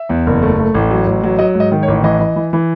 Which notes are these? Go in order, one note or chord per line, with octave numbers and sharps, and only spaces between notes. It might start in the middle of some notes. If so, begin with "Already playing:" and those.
Already playing: E5
E2
F#1
A3
A3
A1
F#3
A1
F#3
F#3 D#5
G#2
D#5
D#3
C#5
A1
E3 D#5
E3
E3
E3